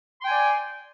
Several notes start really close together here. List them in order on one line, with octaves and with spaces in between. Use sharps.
C6 G5 G#5 D5